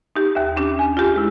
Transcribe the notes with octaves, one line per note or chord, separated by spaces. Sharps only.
D#4 G4
D#2 E5
C#4 D4 G4
G#5
F4 G4 G#4
G#3 E4